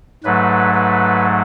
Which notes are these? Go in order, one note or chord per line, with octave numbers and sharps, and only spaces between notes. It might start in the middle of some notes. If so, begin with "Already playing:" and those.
G#2 F#3 A3 B4
B4